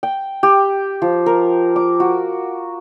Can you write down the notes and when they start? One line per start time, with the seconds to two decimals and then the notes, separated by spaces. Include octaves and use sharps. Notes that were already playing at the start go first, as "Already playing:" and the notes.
0.03 G5
0.43 G4
1.02 F3
1.26 A#4
1.76 D6
2.00 F#4